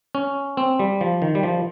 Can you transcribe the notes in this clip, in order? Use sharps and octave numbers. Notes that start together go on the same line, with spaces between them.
C#4
C4
G3
F3
D#3
G3
F3